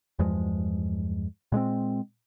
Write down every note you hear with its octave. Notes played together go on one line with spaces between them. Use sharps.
E2 G2 F3 G#3
A#2 G#3 A#3 C4